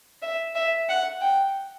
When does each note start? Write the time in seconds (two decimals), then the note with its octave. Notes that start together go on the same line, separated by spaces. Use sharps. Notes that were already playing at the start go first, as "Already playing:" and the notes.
0.22 E5
0.55 E5
0.89 F#5
1.21 G5